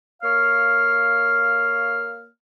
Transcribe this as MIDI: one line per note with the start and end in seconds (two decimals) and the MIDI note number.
0.22 2.27 58
0.22 2.27 73
0.22 2.27 77
0.22 2.27 89